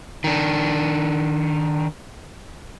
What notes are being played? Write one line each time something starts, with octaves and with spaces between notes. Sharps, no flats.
D#3 D4